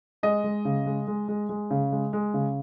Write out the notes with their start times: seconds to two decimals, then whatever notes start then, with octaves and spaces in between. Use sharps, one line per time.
0.23 G#3 D#5
0.44 G#3
0.65 C#3
0.86 G#3
1.08 G#3
1.28 G#3
1.49 G#3
1.71 C#3
1.92 G#3
2.13 G#3
2.34 C#3